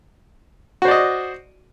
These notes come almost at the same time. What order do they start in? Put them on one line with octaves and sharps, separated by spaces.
F#4 C5 D5 D#5